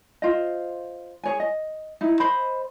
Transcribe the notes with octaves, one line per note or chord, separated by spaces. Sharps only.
F4 C5 D#5
G#4 C#5 G#5
D#5
D#4 E4
C5 D#5 B5